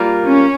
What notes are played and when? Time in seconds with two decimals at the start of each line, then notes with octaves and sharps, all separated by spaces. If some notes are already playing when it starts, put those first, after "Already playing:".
Already playing: G3 A#3 F4 A#4
0.27 C#4